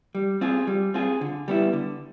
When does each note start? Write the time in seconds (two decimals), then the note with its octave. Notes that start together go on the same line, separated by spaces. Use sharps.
0.15 G3
0.41 C4 F4 G#4
0.67 G3
0.94 C4 F4 G#4
1.21 D3
1.48 G3 B3 E4
1.73 D3